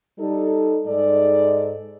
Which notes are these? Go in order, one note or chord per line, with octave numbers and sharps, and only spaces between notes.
G3 D#4 A4
G#2 G#3 D#4 A4 D5